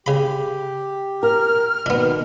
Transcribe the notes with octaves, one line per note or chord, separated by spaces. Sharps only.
C#3 G4 B5
A#4 F6
B2 D#3 B3 D4